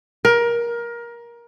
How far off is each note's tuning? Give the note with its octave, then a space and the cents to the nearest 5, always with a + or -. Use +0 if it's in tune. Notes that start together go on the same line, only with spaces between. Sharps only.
A#4 +20